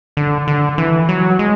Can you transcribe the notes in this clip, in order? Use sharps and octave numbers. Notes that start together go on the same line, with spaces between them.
D3
D3
E3
F#3
G#3